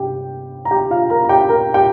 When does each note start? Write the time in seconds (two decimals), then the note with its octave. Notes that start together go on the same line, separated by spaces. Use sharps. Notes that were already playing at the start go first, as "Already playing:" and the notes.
Already playing: G1 C3 G4 G5
0.65 A#5
0.71 G4 G5
0.90 F4 F5
1.10 A#4 A#5
1.25 A#5
1.29 G4 G5
1.49 A#4 A#5
1.74 G4 G5